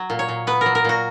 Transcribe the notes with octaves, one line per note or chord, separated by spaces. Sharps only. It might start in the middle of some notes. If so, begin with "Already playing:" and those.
Already playing: F#3
A#2
C#5
A#2
B3 B4
F#3 A#4
A#4
A#2 F#4